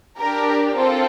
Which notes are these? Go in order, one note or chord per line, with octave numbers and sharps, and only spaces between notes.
D4 G4 A#4
C4 F4 A4